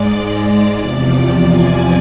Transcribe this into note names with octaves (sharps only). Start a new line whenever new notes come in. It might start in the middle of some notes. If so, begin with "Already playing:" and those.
Already playing: G#2 G#3 D5
E2 C3 F3
G#5